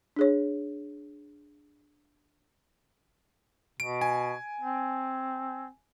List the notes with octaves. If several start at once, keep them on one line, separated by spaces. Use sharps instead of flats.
D4 G#4 C#5
B2 D7
G#5
C4